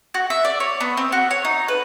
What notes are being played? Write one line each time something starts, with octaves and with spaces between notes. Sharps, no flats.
F#4
E5
D5
C#5
B3
C4
F#4
C#5
D#4
B4